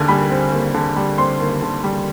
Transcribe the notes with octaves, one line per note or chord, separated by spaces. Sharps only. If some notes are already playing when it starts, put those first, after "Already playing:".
Already playing: D#2 D3 G#5
G3 B5
C4
D#2
D3
G3
C4 C6
D#2
D3
G3